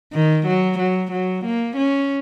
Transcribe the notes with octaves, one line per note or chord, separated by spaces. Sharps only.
D#3
F#3
F#3
F#3
A#3
C#4